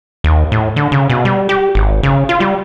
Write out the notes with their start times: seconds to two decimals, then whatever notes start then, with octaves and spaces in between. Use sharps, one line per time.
0.24 D#2
0.52 A2
0.76 D3
0.92 C#3
1.10 B2
1.25 G3
1.49 G4
1.75 G#1
2.03 C#3
2.29 F4
2.40 G3